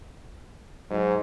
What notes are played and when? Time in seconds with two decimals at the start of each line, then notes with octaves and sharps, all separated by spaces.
0.90 G#2 F#3